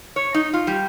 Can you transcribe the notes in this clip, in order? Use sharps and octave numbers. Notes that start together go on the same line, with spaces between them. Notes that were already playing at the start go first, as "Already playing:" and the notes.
C#5
D#4
F4
G3